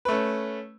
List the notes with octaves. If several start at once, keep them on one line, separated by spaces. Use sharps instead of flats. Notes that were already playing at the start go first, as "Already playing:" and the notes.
A3 C#4 B4